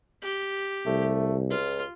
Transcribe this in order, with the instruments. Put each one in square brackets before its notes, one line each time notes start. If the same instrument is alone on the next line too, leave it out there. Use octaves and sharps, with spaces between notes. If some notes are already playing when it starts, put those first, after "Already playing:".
[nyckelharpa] G4
[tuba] C2 [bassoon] A3
[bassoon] C#2 [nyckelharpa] F4